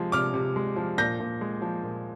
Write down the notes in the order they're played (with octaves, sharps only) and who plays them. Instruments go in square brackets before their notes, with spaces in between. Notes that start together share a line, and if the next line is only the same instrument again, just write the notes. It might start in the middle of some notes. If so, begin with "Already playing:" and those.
Already playing: [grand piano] C3 F3 G#3
C3 D6 F6
C3
G#3
F3
A#2 G6 A#6
A#2
G#3
F3
A#2